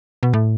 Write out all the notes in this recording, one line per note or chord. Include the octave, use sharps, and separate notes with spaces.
B2
A2